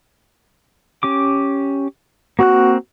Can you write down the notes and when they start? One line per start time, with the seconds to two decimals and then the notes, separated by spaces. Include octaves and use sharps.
1.03 C#4 G4 D6
2.39 A#3 C4 F#4 F#6